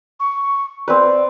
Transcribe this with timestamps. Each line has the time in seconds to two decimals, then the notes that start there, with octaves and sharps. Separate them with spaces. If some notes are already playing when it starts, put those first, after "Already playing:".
0.20 C#6
0.88 C4 B4 D5